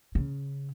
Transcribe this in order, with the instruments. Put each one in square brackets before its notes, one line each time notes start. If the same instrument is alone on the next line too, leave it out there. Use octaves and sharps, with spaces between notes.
[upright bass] C#3